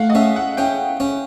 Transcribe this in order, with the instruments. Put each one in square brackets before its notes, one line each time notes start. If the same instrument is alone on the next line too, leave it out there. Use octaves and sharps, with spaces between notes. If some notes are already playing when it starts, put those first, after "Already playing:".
Already playing: [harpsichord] A3 [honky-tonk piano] F5 F#5
[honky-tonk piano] D#5
[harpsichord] C#4 [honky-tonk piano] E5
[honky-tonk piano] F#5
[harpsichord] C#4 [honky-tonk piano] G5
[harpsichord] C#4